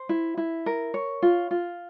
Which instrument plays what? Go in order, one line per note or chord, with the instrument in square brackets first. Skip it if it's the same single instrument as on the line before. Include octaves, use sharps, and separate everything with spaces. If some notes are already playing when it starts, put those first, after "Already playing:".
Already playing: [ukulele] C5
E4
E4
A#4
C#5
F4
F4